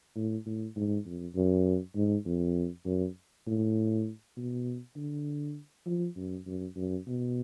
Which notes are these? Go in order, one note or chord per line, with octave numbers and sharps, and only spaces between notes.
A2
A2
G#2
F2
F#2
G#2
F2
F#2
A2
B2
D3
F3
F#2
F#2
F#2
B2